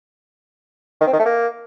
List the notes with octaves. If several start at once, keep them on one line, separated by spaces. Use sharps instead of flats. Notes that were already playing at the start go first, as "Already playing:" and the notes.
D#3
C4
D#3
A3
A#3